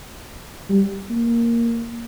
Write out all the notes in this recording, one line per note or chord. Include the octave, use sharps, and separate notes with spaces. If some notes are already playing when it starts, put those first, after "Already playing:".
G3
A#3